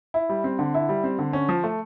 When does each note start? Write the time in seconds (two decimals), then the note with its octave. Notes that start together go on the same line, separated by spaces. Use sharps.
0.14 E4
0.29 G3
0.44 C4
0.59 D3
0.74 E4
0.89 G3
1.04 C4
1.19 D3
1.33 C#4
1.49 F3
1.64 A3